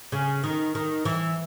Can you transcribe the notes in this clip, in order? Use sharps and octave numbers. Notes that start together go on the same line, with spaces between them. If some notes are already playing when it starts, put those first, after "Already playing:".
C#3
D#3
D#3
E3